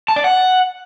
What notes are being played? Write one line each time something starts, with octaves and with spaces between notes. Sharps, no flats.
A5
D5
F#5